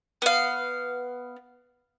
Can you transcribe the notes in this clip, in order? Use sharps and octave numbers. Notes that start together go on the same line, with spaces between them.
B3 F5